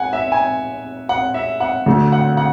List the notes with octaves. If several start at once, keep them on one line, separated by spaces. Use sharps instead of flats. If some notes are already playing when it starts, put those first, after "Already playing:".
Already playing: F#5 G#5
E5
G#5
F#5
E5
F#5
D2 D3 A3
F#5
F#5